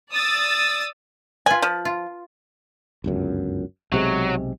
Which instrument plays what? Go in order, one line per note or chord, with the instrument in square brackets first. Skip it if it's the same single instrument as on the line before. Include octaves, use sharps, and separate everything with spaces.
[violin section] D5 D#6 E6 A6
[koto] F4 B4 [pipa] G#5
[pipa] F3
[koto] F4
[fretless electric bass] G1 C#2 F#2
[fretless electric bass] B1 C3 G#3 [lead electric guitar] F#3